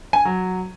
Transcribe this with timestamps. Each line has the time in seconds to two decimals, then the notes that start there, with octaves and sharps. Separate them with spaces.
0.13 G#5
0.25 F#3